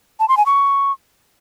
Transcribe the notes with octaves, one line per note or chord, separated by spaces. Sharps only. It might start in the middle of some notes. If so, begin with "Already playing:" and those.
A5
C6
G#5
C#6